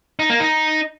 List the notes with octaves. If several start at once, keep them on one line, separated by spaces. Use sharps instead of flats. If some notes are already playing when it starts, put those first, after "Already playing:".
D#4
A#3
D#4